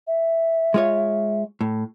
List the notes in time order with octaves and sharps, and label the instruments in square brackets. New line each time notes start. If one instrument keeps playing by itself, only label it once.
[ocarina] E5
[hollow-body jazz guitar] G#3 F4 C#5
A2